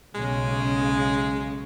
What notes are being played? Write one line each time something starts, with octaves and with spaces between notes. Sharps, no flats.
B1 C#3 G#3